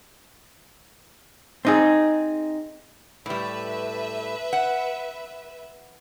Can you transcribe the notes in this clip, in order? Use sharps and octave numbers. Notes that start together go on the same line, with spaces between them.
C4 D#4 G#4
A2 G3 B4 E5
F#5